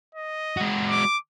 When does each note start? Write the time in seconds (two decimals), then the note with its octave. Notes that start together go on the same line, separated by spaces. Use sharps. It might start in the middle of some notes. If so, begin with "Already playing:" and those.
0.15 D#5
0.57 G#3 F#4
0.89 D6